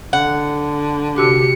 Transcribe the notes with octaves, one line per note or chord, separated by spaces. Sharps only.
D3 F#5
C3 F#4 G4 D6 C#7